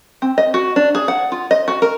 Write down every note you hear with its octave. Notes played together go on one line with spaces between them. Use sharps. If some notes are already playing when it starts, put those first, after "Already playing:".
C4
D#5
F#4
D4
G#4
F#5
F4
D#5
F#4
A#4